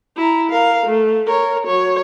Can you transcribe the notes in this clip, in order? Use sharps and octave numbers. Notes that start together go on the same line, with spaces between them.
E4 A#5
A#4 F5
A3
A#4 C#5
F#3 C#5